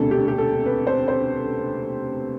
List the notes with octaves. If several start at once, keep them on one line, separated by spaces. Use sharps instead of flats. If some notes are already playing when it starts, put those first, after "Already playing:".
Already playing: E1 D2 C3 A4
G4
G4
A4
B4
C5
C5